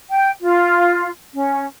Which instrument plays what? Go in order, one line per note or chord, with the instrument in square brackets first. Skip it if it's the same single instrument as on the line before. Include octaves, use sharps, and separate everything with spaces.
[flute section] G5
F4
C#4